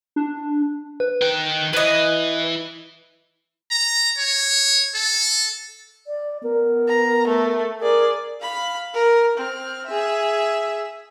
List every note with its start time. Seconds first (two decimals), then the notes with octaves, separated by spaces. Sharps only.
0.16 D4
1.00 B4
1.22 D#3 G5 F#6
1.73 E3 B4 D#5
3.72 A#5
4.18 C#5
4.95 A4
6.07 D5
6.43 B3 A#4
6.88 A#5
7.28 A3
7.80 G#4 A#4 D5
8.42 F5 B5
8.94 A#4
9.37 C4 F6
9.86 G#4 E5